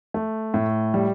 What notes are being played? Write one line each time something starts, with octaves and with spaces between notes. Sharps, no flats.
A3
A2
G3